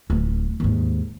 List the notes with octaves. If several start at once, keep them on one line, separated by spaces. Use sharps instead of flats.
D1
D#2 G#2